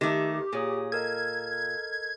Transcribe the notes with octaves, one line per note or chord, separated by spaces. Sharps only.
D#3 A3 G4
A#2 G#4 C#5 D#6
A4 A#4 D#5 G#6